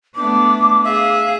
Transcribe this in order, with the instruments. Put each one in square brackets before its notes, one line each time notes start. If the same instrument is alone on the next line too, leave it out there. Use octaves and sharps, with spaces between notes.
[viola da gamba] A3 B3 D4 [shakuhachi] D6
[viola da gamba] G#4 [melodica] E5 [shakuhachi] F5